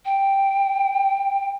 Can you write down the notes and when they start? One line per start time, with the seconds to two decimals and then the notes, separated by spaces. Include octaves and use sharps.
0.05 G5